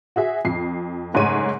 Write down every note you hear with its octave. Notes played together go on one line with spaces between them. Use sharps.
F#4 G#4 E5
F2 C7
F#1 G#2 A3 G#4 C#5 D#7